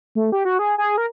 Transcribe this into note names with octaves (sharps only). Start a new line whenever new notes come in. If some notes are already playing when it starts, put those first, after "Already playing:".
A3
G4
F#4
G#4
G#4
A#4